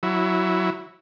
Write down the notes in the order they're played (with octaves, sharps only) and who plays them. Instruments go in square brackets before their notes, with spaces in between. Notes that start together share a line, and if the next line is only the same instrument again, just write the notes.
[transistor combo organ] F#3 E4